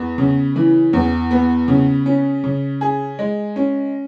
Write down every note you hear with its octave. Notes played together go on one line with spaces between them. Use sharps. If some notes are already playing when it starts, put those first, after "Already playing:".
Already playing: E2 B3
C#3
E3
E2
B3
C#3
C#4
C#3
G#4
G#3
C#4